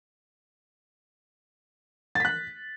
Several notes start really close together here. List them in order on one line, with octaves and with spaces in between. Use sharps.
A6 B6 F#6